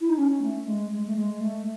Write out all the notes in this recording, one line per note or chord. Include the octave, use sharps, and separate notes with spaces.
E4
D#4
C#4
A3
G#3
G#3
A3
G#3
A3